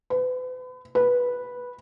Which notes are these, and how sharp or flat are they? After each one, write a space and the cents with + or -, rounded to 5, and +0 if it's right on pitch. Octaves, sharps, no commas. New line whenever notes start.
B4 +35
B4 -10